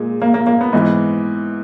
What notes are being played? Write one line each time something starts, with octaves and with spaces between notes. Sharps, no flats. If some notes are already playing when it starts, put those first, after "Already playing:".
Already playing: A#2 G#3
A#3
A#3
A#3
B3
G#2 E3